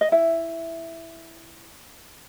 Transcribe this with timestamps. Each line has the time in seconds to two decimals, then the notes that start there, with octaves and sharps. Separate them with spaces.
0.01 D#5
0.12 E4 E5